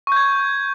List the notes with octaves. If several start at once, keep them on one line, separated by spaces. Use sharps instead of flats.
C#6 G6 G#6